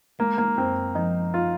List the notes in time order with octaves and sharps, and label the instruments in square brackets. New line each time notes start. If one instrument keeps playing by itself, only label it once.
[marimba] G#3 [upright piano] A#3
[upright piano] A#3
[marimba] F#2 [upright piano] C4
[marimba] F3 [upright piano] D#4
[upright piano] F4